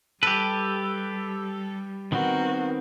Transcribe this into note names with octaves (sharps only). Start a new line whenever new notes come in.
G3 G4 A4 B4
D#3 B3 C4 F#4 A#4